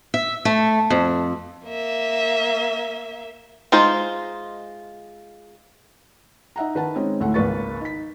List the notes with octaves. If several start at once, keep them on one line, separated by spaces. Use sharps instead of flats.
E5
A3
F2
A#3 E5
G#3 D#4 F4 C5
D#4 E5 F#5 A#5
D#3 B4 F#5 A5
G#3 C4 C#4 D#4
D2 A2 A3 F#5
G#1 C#2 A#3 B4 C#6 A6
D#4 B6